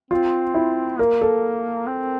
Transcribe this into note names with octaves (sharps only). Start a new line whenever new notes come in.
C4 F4
E4
A#3 A#4
A4
C4